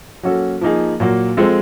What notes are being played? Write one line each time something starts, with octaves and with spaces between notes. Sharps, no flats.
F#3 A#3 C#4 F#4 A4
F3 A#3 D#4 G#4
A#2 F#3 A#3
F3 G#3 C4 F4 A4